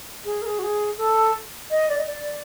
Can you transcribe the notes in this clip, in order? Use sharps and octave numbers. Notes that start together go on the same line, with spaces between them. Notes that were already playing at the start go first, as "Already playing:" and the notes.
G#4
A#4
G#4
F#4
G#4
A4
D#5
D5
D#5
D5